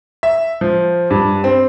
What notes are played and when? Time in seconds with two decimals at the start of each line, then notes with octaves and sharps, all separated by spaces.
0.23 E5
0.61 F3
1.10 G2
1.44 C4